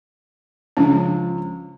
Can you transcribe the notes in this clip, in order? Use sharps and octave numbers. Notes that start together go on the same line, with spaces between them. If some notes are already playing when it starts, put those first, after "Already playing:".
C#2 F3 C#4 D4